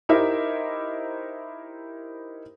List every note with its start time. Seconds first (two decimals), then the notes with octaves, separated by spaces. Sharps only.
0.09 D#4 E4 G4 A#4 C5 E5